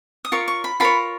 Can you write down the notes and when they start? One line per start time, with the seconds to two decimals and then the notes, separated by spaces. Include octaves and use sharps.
0.25 D#6
0.32 F4 A#4 C#5 C#6
0.48 C#6
0.64 B5
0.80 F4 A#4 C#5 B5